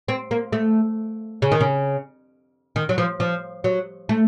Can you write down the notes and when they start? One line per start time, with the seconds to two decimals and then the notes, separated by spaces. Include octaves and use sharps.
0.08 C4
0.31 A#3
0.53 A3
1.42 C#3
1.52 D#3
1.60 C#3
2.76 D#3
2.89 F#3
2.98 F3
3.20 F3
3.64 F#3
4.09 A3